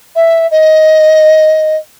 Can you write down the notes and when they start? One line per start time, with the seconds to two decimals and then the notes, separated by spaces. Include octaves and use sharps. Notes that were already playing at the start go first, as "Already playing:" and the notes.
0.15 E5
0.51 D#5